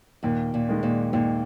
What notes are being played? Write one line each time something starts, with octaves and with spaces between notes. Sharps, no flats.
D#2 A#2
A#2
D#3 G#3
A#2
D#2 A#2